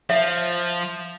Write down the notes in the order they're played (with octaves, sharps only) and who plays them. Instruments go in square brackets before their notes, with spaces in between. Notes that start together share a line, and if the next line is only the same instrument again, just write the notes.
[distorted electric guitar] F3 [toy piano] E5